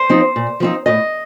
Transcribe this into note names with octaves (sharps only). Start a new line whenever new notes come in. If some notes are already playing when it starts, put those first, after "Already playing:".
Already playing: C5
F3 C4 D#4
A#2
F3 C4 D#4
A2 D#5